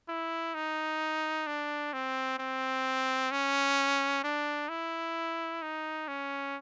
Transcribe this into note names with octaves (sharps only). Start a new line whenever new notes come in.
E4
D#4
D4
C4
C4
C#4
D4
E4
D#4
C#4